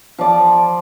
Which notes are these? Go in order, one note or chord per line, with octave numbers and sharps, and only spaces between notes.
F3 D5